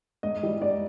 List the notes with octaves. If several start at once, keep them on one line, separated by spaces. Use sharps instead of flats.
G#2 D#5
E3 G3
G#2 D5